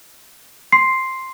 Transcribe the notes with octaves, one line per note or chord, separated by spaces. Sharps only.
C6 C7